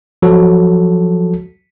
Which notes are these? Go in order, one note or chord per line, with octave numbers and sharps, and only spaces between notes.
F3 F#3 F#4 A4